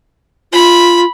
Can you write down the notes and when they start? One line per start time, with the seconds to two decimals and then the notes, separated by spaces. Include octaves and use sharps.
0.53 F4 B5